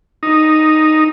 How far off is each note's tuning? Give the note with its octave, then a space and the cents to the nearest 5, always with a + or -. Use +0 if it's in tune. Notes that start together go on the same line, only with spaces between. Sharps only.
D#4 -5